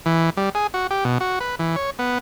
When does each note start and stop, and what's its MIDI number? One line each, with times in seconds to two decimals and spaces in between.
0.06 0.30 52
0.37 0.50 55
0.55 0.67 68
0.74 0.87 66
0.91 1.04 67
1.05 1.18 47
1.20 1.39 66
1.40 1.55 71
1.59 1.76 52
1.76 1.90 73
1.99 2.18 59